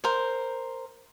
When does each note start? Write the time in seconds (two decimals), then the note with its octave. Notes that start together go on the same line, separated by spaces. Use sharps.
0.04 A#4 C5